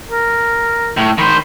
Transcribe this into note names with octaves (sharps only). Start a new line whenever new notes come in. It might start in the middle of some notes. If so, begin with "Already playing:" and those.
A#4
A2
D#3 C5 B5